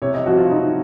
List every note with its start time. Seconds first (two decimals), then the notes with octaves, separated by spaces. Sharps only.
0.02 C3 C#5
0.14 D#5
0.26 F3 C4 F#4
0.38 F4
0.50 C3 D#4